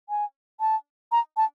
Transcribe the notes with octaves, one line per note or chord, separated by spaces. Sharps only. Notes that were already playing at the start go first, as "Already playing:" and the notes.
G#5
A5
A#5
A5